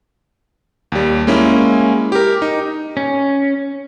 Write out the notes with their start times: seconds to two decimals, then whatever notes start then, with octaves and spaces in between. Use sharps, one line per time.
0.92 D#2 G3
1.27 G#3 A#3 C#4 E4
2.12 G4 A#4
2.42 D#4
2.97 C#4